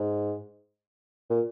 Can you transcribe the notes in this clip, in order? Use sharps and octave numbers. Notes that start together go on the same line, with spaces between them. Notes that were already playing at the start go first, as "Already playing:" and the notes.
Already playing: G#2
A#2